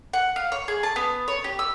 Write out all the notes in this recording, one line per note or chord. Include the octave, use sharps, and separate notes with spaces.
F#5
F5
C#5
G#4
A5
B3
C#5
G4
E6